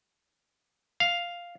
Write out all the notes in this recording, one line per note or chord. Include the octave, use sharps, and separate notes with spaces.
F5